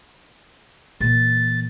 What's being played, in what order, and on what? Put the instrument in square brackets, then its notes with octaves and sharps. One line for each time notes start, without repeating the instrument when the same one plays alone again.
[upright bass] A#2 E3 [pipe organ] A6